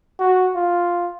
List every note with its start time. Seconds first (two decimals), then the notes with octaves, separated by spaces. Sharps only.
0.19 F#4
0.55 F4